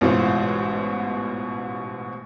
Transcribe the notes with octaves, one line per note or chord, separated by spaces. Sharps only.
A1 G#2 B2 E3 F4 C5